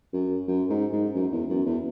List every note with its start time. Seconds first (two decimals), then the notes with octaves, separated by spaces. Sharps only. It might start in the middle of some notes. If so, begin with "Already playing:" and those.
0.13 F#2
0.48 F#2
0.70 G#2
0.93 G#2
1.15 F#2
1.32 E2
1.50 F#2
1.66 E2